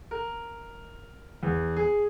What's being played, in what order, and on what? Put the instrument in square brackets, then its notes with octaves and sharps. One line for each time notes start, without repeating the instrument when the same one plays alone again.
[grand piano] A#4
E2
G#4